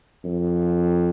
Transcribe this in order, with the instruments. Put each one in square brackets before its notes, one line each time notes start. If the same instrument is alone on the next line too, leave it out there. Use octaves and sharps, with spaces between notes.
[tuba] F2